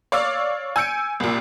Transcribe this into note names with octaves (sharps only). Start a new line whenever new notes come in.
C#5 D5 F5 D6 E6
G#5 E6 G6 C#7 D7
C2 A#2